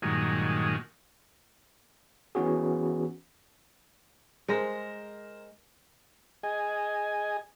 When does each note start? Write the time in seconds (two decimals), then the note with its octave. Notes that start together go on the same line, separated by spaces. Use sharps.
0.02 G2 A#2 D#3 F#3 G#3
2.35 E3 B3 C#4 F#4 G#4
4.48 G#3 A#4 C5 A#6
6.43 G#4 D#5 G#5